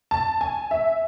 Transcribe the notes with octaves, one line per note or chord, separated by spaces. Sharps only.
A5
G#5
E5